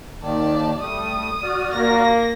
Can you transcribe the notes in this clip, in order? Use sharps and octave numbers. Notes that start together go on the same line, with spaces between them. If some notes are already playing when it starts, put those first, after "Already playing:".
D#2 D#3 D5 A5
G3 A3 D#6
F#4 D5 F6
A#3 A#6